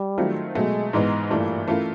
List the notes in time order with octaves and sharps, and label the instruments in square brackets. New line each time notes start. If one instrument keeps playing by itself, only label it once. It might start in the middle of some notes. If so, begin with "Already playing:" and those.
Already playing: [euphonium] G3
[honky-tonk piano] D#3 F#3 A3 C4 F4
[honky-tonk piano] B2 F#3 A3 [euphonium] G#3
[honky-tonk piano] G#2 E3 G#3 B3 D#4
[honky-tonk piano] G2 E3 A3 D4 [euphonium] A#2
[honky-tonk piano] E3 A3 C#4 F4 A#4